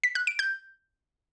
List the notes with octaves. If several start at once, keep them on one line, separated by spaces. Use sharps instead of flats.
B6
F#6
D7
G6